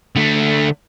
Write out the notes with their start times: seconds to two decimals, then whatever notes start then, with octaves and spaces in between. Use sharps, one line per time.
0.16 D3 A3